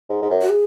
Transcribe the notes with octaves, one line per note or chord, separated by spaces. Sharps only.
G#2
G#2
F#2
F#4
G#4